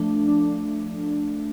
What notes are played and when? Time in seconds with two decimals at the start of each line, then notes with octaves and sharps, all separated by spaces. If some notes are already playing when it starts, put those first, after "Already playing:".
Already playing: F3 A3 D4
0.28 D4